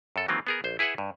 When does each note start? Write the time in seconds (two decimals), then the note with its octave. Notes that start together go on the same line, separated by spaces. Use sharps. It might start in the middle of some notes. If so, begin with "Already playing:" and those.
0.16 F#2 A4
0.28 D#3 E3 F#3 A#3 C4 F4
0.47 B3 G#4 A#4
0.64 A#1 C5
0.79 E4 G#4 B4 E5 F#5
0.98 G2